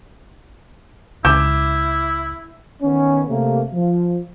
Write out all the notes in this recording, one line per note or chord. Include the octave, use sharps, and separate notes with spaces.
C#2 E4 D6 G6 E7
D#3 B3 C#4
C3 A3 A#3
F3